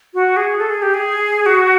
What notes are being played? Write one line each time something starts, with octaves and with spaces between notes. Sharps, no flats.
F#4
G#4
A4
G#4
G4
G#4
F#4